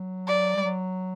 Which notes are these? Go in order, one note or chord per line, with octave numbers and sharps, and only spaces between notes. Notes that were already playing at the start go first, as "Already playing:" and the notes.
Already playing: F#3
D5
G3
F#3